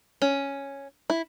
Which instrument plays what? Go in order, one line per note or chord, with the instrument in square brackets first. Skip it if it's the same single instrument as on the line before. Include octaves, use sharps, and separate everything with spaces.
[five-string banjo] C#4
E4